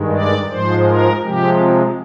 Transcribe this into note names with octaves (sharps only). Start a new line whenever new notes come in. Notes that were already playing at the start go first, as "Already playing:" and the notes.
Already playing: G2 D#3 G#3
D5
G#2 F3 G#3 C5
A#4
C3 F3 G#3 G4